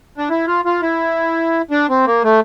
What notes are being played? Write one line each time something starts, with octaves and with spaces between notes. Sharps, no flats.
D4
E4
F4
F4
E4
D4
C4
A#3
A3